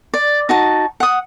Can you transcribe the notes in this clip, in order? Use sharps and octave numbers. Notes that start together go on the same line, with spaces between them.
D5
D#4 F#4 A5
F#5 D#6